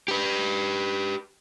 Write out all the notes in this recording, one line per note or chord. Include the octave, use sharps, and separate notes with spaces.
G4 B4